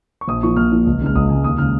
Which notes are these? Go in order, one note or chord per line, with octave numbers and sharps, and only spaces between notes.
C#6
A#1 D#6
A#2 F3 C#6
A#1 F6
A#2 F3
C#2
C#3 G#3 F6
C#2 D#6
C#3 G#3 G#5
D#2 D#6
C#3 G#3 F6